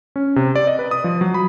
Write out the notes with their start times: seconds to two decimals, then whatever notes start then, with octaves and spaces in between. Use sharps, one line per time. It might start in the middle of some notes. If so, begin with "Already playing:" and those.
0.16 C#4
0.36 C3
0.56 D5
0.67 D#5
0.79 B4
0.91 D#6
1.04 F3
1.21 F#3
1.34 B5